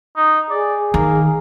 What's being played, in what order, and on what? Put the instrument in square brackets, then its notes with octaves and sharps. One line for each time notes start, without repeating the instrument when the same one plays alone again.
[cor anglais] D#4
[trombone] G#4 [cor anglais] D5
[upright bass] D#3 [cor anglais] A#3